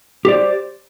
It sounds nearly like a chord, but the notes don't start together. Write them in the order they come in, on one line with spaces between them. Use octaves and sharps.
G4 D5 C5